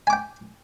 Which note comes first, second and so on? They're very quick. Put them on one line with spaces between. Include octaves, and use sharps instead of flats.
G#5 D6 G5